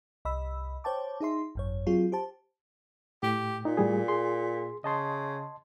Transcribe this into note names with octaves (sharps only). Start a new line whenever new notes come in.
C2 D#5 B5 E6
C5 C#5 G5 A5 D6
D#4 G#4 E5 C6
G#1 F#2 C#5
F#3 C4 F4 G#4
G4 C5 A5
A2 G4
A#2 D#4
A2 G3 G#4
G#4 C6
C#3 D#5 A5 C6